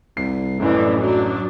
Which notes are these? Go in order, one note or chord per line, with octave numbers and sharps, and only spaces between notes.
C2 C7
A1 F#2 A2 E3 D4
F#3 D4